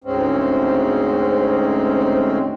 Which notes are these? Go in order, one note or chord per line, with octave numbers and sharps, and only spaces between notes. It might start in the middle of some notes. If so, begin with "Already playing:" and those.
D2 G#2 G#3 C4 C#4